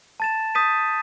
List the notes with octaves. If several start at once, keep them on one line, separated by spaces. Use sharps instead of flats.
A5 A6 E7
D#6 G6 A6 B6 D#7